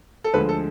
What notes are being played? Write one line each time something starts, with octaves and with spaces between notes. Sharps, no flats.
A4
D2 D3 F3 G#3 B4
A4